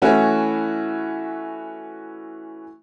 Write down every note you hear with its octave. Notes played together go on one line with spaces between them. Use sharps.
E3 A3 C#4 E4 F#4